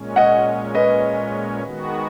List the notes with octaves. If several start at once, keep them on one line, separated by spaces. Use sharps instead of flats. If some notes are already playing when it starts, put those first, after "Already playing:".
Already playing: A#2 G#3 C#4
D#5 F#5
B4 D#5
D#3 G#3 B3 F#4